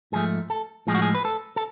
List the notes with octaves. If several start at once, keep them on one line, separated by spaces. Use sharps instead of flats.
G#2 F3 A3 G#4
A4
A2 F3 G#3 G#4
F#4
G#4
B4
A4
A4